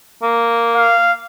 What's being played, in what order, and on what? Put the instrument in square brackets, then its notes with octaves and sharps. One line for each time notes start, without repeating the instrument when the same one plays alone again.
[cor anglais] A#3
[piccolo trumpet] F5